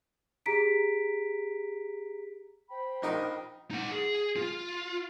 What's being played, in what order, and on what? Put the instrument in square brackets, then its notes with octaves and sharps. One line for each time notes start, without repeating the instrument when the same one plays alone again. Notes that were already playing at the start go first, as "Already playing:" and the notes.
[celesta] G4 G#4 A#5 B6 D7
[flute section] C5 G5 B5
[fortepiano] A#1 D#4 A#4
[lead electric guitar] D#4 F#5
G#4
F4